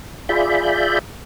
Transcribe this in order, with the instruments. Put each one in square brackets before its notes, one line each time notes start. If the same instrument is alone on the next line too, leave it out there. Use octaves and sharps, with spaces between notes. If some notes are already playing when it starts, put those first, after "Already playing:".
[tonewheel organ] F4 G#4 D5 E5 B5 G6